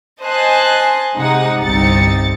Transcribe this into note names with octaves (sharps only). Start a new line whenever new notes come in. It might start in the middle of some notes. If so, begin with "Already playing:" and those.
C5 D#5 G#5 A5 C6 F#6
C3 G#3 D#4 F#5
G1 C2 C4 D#4 A6 C#7